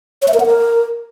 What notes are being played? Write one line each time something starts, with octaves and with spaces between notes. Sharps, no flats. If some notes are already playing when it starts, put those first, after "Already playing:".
C#5
E5
A#4
F#5
A#4